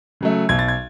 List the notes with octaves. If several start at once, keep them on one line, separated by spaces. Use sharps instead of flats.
C#3 F#3 A3
B1 G#6
A6
G#6